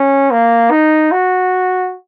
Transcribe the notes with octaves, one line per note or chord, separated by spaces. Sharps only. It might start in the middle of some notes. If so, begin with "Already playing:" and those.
Already playing: C#4
A#3
D#4
F#4